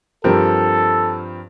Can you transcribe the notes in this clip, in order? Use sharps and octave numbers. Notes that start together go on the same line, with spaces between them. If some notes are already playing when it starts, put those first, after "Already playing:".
G2 F3 C4 G4 A4 A#4